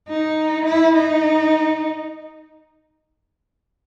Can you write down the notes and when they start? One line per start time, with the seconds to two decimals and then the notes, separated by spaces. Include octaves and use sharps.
0.09 D#4
0.65 E4
0.95 D#4